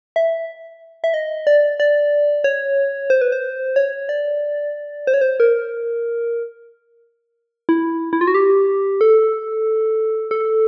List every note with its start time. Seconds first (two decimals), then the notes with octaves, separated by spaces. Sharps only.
0.16 E5
1.04 E5
1.14 D#5
1.47 D5
1.80 D5
2.44 C#5
3.10 C5
3.21 B4
3.32 C5
3.76 C#5
4.09 D5
5.07 C5
5.14 C#5
5.21 C5
5.40 A#4
7.69 E4
8.13 E4
8.21 F4
8.27 F#4
8.35 G4
9.01 A4
10.31 A4